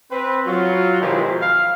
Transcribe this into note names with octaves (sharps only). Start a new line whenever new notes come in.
C4 B4
F#3 F4
B2 D#3 F3 G#3 E4 G4
F5